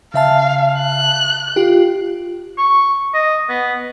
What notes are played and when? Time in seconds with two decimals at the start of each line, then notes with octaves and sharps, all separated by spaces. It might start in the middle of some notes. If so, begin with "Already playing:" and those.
0.14 C#3 E5 F5 A5
0.80 F#6
1.56 F4 G4
2.58 C#6
3.14 D#5
3.49 B3